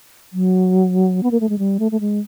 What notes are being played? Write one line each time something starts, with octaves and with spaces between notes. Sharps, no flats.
F#3
B3
A#3
A3
G#3
G3
A3
A3
G#3